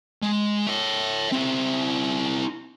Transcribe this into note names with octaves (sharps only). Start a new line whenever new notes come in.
G#3
C#5 E5
C4 E4